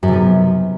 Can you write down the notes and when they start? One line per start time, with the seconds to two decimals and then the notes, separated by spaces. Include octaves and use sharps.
0.03 F#2
0.08 C3
0.13 B3